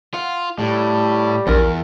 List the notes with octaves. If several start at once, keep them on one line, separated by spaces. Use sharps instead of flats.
F4 F#5
A2 G3
A#1 E2 F4 F#4 A#4